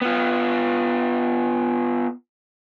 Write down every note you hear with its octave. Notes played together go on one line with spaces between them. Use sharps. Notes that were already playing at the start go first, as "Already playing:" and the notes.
B3 F4